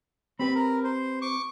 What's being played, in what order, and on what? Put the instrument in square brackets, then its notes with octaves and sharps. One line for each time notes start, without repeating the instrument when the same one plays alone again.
[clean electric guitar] C4 G4 B4 [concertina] B5
[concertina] A#4
C5
C#6 D6